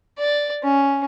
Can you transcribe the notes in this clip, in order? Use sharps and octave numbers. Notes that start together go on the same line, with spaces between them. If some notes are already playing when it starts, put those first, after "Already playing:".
D5
C#4